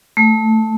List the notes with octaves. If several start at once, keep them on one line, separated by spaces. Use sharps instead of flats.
A3